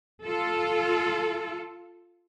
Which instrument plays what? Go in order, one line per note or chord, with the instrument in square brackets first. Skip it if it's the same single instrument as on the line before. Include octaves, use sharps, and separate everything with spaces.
[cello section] F4 A4